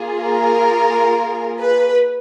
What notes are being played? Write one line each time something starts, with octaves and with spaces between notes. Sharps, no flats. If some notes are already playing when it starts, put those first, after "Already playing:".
Already playing: A#3 F4 G#4
A#4
B4